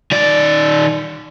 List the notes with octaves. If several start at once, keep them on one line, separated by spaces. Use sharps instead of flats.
D#3 D5